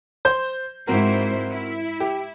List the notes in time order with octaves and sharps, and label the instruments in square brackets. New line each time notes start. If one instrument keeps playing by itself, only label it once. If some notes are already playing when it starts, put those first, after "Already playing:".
[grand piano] C5 G6
[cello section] G#2 E4 C5 [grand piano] C4 F#4 A#4
[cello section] E4
[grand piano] G4